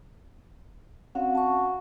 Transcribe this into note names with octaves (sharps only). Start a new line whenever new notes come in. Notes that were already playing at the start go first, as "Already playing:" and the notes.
C4 C#4 F#4 F5
A5 C#6